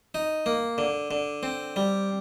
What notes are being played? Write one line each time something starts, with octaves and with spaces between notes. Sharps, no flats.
D#4
A#3
D3
D3
C4
G3